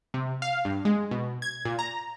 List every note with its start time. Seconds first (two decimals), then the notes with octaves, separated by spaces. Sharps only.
0.14 C3
0.42 F5
0.65 G2
0.85 G#3
1.11 B2
1.42 G#6
1.65 A#2
1.79 A#5